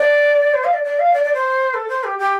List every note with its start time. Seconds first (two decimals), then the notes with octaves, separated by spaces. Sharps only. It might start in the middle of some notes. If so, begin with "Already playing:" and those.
Already playing: D5
0.53 C5
0.64 F5
0.73 D5
0.83 D5
0.99 F5
1.13 D5
1.23 D5
1.33 C5
1.73 A4
1.88 C5
2.03 G4
2.18 G4